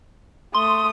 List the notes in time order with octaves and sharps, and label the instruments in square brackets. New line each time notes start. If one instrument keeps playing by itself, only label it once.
[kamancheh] A3 D#6 [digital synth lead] C6